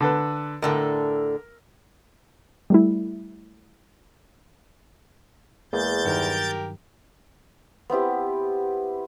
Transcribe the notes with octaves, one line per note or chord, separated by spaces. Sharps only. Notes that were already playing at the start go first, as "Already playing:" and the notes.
D3 A4 B4
A2 D3 A4 A#4 E6
G3 A3 E4
E2 G#3 A#3 G#4 G6 A6
G2 D#3 F#3 G4 A#4
B3 C4 E4 G4